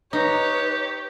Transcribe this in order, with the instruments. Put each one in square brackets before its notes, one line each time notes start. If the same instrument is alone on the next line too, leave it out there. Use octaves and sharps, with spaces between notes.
[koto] D#4 [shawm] G4 [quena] B4 [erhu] C#5